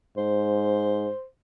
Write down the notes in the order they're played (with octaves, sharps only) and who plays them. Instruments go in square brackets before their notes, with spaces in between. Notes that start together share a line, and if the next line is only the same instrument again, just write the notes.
[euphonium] G#2 [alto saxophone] C5